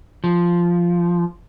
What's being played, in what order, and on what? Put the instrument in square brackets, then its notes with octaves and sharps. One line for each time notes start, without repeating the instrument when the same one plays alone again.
[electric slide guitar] F3